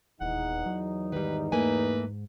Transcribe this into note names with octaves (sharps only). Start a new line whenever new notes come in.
D#1 E2 D#4 F#5
F#3
G#2 D#3 G3 B4
A3 A#3 B4 G#5